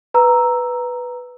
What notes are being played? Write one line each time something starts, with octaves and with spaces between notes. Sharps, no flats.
B4 A#5 E6